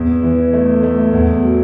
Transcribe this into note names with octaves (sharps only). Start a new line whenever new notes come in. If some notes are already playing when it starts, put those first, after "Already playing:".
Already playing: E2
E3
A3
A3
E2
F#3